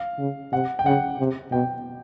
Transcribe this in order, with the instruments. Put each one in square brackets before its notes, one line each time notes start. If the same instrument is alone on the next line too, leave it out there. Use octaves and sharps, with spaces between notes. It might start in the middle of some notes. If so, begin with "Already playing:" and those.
Already playing: [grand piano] F5
[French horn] C#3
[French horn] C3 [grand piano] F#5
[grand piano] G5
[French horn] C#3 [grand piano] F#5
[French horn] C3
[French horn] B2 [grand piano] G5